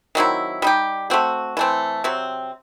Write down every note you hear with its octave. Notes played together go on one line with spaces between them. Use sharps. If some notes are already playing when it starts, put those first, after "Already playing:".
D#3 F#3 C4 E4
G3 D#4 G4
A3 C4 F#4
E3 A3 C4
C3 F#3 C4